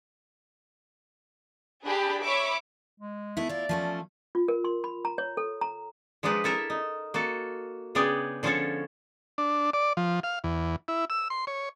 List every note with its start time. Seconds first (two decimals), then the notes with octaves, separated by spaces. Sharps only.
1.86 D4 G4 G#4 B5
2.23 C#5 E5 B5 C#6 D6
3.00 G#3
3.37 A3 B3 E4
3.49 E4 F4 D5
3.69 F3 A3 C#4
4.35 F4
4.48 A#4
4.64 C6
4.84 B5
5.05 A#5
5.18 C#5
5.37 A4
5.61 A#5
6.23 F3 G#3 D4 D#4 B4
6.44 E4 A4 A#4 E5
6.70 D#4
7.14 A#3 F#4 A4
7.95 C#3 B3 D4 G#4 D5 G5
8.43 D3 F3 C#4 F4 A4 C#5
9.38 D4
9.73 D5
9.97 F3
10.23 F5
10.44 E2
10.88 E4
11.10 E6
11.30 C6
11.47 C#5